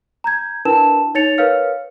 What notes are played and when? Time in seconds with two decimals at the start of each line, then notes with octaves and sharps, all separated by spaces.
0.24 A#5 G6 G#6
0.65 D4 E4 A#4 B4 A5 E7
1.15 D#4 C#5 A6 C#7 F7
1.38 A#4 B4 C#5 F5 F6 C#7